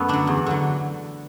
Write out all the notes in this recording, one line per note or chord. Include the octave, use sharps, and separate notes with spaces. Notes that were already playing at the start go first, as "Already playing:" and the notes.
Already playing: F#2 A3 B3
D3 F#3 D4
E2
D3 F#3